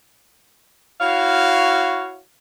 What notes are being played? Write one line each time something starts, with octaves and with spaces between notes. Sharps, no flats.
E4 F#4 C#5 F5